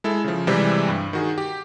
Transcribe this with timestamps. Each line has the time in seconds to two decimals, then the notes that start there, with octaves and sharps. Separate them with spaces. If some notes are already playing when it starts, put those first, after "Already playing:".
0.04 G#3 E4 A4
0.24 C#3 F3
0.47 C3 E3 G3 G#3 C4
0.88 G2
1.13 D#3 F#4 G#4
1.38 G4